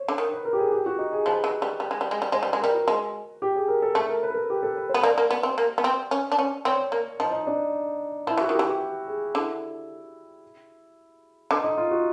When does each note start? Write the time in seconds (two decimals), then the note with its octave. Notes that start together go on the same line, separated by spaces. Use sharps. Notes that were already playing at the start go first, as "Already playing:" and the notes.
Already playing: C5 C#5
0.08 D3
0.18 D#3
0.32 B4
0.45 A#4
0.53 G4
0.58 G#4
0.72 G4
0.86 F#4
0.99 D#4
1.13 G#4
1.26 F3 B4
1.44 F#3
1.62 G3
1.80 G3
1.91 G#3
2.01 G3
2.11 G#3
2.22 G3
2.32 G#3 C5
2.43 G3 B4
2.53 G#3
2.61 G3 A#4
2.75 F#4
2.88 G#3
3.42 G4
3.56 G#4
3.68 A#4
3.82 A4
3.95 A3 A4
4.09 A#4
4.23 B4
4.30 A#4
4.36 A4
4.50 G4
4.63 A4
4.77 B4
4.89 B3 C5
5.03 A#3 D5
5.18 A#3
5.31 B3
5.43 C4
5.58 A#3
5.78 B3
5.84 C4
6.11 C#4
6.32 D4
6.39 C#4
6.65 C4 C#5
6.92 A#3
7.20 F3 D#4
7.32 D#4
7.47 D4
8.27 F3 E4
8.38 E3 F#4
8.49 D#3
8.54 G4
8.59 E3
8.68 G4
9.07 G#4
9.35 D3 E4
11.51 D3 D#4
11.64 D#4
11.77 F4
11.91 F#4